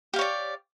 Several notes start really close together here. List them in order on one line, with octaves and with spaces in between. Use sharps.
G4 F5 C#5 D5